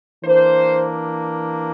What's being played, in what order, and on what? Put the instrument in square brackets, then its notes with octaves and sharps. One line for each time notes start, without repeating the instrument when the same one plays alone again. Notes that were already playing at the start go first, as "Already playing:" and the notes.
[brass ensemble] E3 A#3 D4 C5